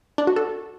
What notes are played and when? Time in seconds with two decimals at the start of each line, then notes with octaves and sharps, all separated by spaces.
0.18 D4
0.27 F#4
0.36 A4